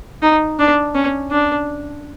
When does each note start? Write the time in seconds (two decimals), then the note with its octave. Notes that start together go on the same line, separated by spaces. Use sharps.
0.22 D#4
0.59 D4
0.95 C#4
1.31 D4